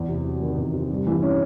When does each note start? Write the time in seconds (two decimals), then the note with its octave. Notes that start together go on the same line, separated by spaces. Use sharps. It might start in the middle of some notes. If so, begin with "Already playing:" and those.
Already playing: E2
0.09 C3
0.25 F#3
0.42 D#3
0.58 E2
0.74 C3
0.89 G2
1.07 E3
1.23 C#4